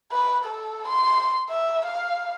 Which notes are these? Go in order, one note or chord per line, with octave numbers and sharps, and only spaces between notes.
B4
A4
C6
E5
F5